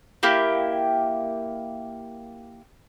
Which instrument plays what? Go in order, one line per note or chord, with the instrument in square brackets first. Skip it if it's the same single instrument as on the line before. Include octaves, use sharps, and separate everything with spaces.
[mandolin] A#3 E4 G4